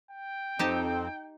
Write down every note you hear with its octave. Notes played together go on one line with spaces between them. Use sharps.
G5
F2 C4 D#4 G4 A5